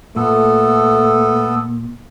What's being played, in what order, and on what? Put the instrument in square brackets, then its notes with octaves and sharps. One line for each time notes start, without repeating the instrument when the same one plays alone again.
[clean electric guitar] A#2 [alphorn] A3 [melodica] B3 A4